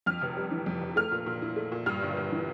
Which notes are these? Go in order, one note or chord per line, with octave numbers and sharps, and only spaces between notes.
F2 F6
F1
G3
E3
F2
F1
A3 F6
A#2
A#2
E4
A3
A#2
G2 F6
G1
G1
E3